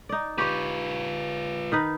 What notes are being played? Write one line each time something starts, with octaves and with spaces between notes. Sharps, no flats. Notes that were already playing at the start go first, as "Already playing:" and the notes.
D#4 D5
F4 G4 B4 C#5
D#3 D#4 B4